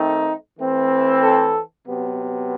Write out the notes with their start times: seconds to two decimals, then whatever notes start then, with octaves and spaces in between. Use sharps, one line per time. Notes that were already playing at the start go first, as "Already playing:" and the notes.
Already playing: D#3 A3 C4 D#4
0.58 E3 A3 C4
1.22 A4
1.86 C3 F#3 B3